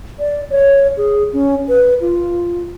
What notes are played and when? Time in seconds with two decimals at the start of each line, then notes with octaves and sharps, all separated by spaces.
0.20 D5
0.50 C#5
0.97 G#4
1.33 C#4
1.69 B4
2.01 F4